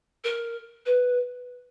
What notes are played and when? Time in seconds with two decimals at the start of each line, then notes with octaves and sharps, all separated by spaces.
0.24 A#4
0.85 B4